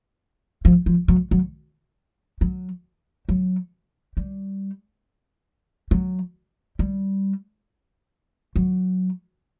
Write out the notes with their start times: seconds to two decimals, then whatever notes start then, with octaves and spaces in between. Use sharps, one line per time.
0.65 F3
0.86 F3
1.08 F#3
1.31 F#3
2.41 F#3
3.29 F#3
4.17 G3
5.91 F#3
6.79 G3
8.56 F#3